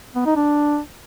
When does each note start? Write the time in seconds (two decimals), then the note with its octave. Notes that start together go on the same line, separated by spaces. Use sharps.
0.15 B3
0.26 D#4
0.36 D4